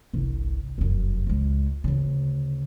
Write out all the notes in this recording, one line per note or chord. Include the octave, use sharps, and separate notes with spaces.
G1 C2
F1 F#2
C#2 G#3
D2 C#3